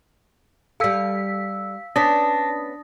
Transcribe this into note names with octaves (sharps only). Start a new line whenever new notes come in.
G3 A4 F5 E6 B6
B3 C#4 D4 B4 D#6 A6 A#6